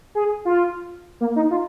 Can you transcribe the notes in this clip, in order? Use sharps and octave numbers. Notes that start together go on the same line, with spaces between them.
G#4
F4
A#3
D#4
F4